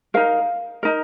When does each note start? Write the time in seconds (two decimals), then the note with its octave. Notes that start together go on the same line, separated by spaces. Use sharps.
0.14 D#4 A#4 F5
0.83 D#4 A#4